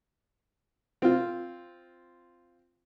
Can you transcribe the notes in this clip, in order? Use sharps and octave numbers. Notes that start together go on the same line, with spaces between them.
C4 F4